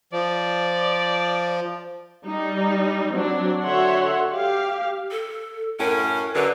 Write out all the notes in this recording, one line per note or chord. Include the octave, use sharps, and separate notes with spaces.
F3 D5
G3 D#4
F#3 C4 D4
D3 F#4 C#5 E5 F#5 C6
G4 F5
A4
F#2 A2 C#4 A#4
F#2 D3 B4